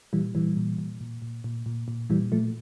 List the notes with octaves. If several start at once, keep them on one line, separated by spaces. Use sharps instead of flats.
A#2 E3 G3
A#2 E3 G3
A#2
A#2
A#2
A#2
A#2
A#2
A#2
A#2 E3 G3
A#2 F3 A3